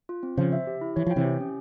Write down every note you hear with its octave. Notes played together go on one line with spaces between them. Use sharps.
F4
C4
C#3 F3 C5
E5
G4
E4
E3 C#5
F3 G5
C3 E3
G4
C#4